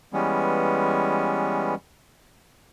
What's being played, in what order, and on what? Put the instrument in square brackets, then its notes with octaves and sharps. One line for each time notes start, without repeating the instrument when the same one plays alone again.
[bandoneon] E3 G3 G#3 B3 C#4